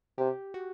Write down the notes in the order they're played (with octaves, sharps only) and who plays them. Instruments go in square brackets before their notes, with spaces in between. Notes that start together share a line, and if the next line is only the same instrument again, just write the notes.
[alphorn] C3 [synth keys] G4
[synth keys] F#4